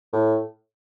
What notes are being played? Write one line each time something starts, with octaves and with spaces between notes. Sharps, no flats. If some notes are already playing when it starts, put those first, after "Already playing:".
A2